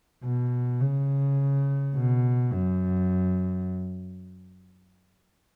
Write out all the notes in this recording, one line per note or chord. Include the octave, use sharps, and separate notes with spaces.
B2
C#3
B2
F#2